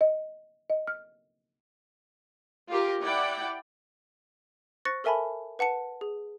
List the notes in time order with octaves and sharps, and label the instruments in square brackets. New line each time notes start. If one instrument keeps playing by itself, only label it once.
[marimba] D#5
D#5
F6
[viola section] F4 G4 A#4
E4 D5 F#5 G5
[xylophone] C5 C#6 F#6 A6 A#6 C#7
A4 A#4 E5 G#5 A5 B5
B4 F#5 A5 C#7
G#4